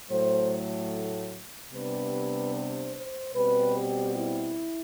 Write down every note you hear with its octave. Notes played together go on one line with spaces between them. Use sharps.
A2 F#3 A3 C5
C3 G3 B3 D4 B4
C5
C5
B2 G3 C4 B4
G4
E4